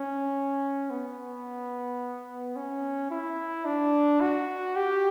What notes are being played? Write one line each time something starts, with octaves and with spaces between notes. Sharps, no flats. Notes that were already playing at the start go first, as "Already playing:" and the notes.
Already playing: C#4
B3
C#4
E4
D4
F#4
G4